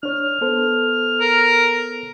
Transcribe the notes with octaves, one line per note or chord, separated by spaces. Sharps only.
D4 C#5 F6
B3 A4 C5
A#4